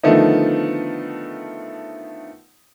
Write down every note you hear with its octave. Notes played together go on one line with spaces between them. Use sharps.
D3 D#3 F3 A3 B3 D#4